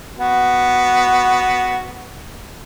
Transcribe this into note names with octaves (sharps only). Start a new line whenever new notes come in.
B3 F#4